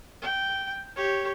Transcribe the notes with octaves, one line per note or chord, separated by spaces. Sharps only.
G5
G4 C#5